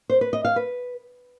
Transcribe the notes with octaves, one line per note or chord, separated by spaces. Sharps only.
C5
B4
D#5
F5
B4